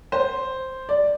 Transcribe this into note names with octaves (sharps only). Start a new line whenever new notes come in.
C5
D5